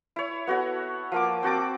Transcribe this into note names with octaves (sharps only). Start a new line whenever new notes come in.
E4 C#5
B3 F#4 A4 C#5
F3 A#3 D6
C4 F#4 A5 D6